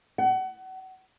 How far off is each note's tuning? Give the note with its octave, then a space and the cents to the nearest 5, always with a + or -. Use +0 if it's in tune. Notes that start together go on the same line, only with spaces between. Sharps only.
F#5 +30